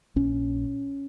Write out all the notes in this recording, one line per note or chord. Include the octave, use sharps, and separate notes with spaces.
A#1 C#4